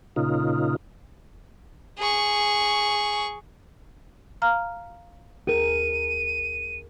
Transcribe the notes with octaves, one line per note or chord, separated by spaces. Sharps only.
A#2 C#3 D#4 F4
G#4 C#6
F5 A#5 F6
D#2 G#4 A#4 D#7